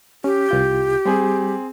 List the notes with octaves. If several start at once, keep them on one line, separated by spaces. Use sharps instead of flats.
C#4 G4
C2 F4 G6
G3 C4 G#4